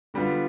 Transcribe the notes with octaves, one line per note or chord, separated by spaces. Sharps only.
D3 G3 B3 F4